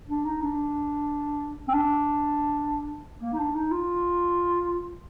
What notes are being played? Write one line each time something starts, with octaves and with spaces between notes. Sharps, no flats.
D4
D#4
D4
C4
D4
A#3
D#4
D4
D#4
F4